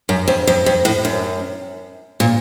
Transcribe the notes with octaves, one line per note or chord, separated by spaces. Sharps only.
F#2
F2
F2
F2
A2
F#2
A#2